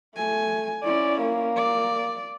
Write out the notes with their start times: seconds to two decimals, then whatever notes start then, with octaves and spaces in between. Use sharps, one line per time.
0.16 A3 G#5
0.84 C#4 E4 D5
1.22 A#3
1.56 D5